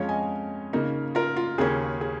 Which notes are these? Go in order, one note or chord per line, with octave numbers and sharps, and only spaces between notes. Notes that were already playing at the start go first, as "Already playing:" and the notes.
Already playing: F2 F3 G#3 C#4 C#5 F5
D#5 G#5
C#3 A#3 D#4
F4 A#4
F4
D#2 C#3 A#3 C#4 G#4
G#4